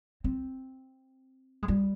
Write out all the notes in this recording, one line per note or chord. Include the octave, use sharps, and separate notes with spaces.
C4
G#3
G3